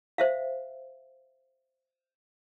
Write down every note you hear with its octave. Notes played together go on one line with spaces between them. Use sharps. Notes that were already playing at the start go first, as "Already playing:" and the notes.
C5 E5 F5